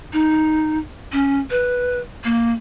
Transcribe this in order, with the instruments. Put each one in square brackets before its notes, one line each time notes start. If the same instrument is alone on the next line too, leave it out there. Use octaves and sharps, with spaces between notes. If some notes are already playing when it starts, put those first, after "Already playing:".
[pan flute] D#4
C#4
B4
A#3